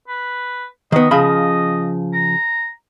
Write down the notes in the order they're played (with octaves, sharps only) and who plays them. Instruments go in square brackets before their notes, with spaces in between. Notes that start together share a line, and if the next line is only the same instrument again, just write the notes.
[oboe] B4
[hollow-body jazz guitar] D#3 B3 [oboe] D#5
[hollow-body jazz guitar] C#3 F3 B5
[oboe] A#5